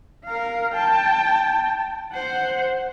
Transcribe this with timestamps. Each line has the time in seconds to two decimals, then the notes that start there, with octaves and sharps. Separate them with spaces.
0.25 A#4 F5
0.73 G5 A5
2.13 C5 F#5